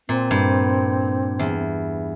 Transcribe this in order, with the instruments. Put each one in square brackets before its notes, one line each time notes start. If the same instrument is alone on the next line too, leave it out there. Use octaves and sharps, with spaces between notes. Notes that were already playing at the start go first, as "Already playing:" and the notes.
[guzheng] A#2 [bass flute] C4
[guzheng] G2
E2